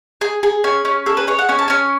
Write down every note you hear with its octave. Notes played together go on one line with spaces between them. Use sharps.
G#4
G#4
C#4 G#5
C#4
G#4 A4
B4
G#4 C#5
F#5
C#4 G#5
A5
C#4 G#5